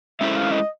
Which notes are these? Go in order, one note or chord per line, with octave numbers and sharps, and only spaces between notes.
G#3 C#4 E4 A4 C5 E5
F5
D#5